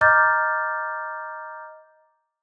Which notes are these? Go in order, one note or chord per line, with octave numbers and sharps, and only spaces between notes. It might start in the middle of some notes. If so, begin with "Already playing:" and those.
D#5 A#5 D6 F6 G6 A6